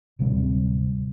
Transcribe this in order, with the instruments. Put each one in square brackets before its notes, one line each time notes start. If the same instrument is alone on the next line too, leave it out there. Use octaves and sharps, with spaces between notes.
[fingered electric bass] D1 C3 G3 C4